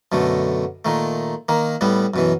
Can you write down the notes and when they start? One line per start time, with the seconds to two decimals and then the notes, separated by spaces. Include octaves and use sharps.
0.12 F#2 B2 D3 A3
0.85 A#2 D#3 A3
1.49 D#3 A#3
1.81 A2 G3 B3
2.14 F#2 B2 E3